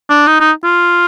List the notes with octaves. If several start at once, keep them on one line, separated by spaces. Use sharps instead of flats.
D4
D#4
D#4
F4